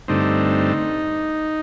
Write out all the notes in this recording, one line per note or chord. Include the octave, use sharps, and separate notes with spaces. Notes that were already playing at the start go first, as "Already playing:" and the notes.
G2 D3 A3 C4 D#4